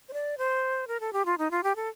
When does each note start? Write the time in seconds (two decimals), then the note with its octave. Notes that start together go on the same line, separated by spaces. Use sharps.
0.09 C5
0.13 D5
0.38 C5
0.88 A#4
1.00 A4
1.13 G4
1.26 F4
1.38 D#4
1.51 F4
1.63 G4
1.76 A4